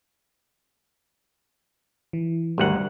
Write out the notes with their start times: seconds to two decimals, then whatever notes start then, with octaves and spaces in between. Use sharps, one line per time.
2.13 E3
2.58 G#1 D2 G3 A#4 F#5